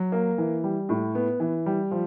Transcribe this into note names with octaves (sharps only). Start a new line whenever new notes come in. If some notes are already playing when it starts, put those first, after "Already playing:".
Already playing: F#3
A#3
E3
G3
A2
B3
E3
G3
F3